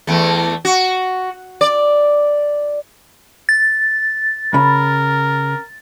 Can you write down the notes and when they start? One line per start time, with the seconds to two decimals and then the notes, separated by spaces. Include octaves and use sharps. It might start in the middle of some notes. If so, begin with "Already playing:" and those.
0.07 E2 A3
0.65 F#4
1.61 D5
3.49 A6
4.54 C#3 A#4 B5